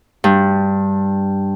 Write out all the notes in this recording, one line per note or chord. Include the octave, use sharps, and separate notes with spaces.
G2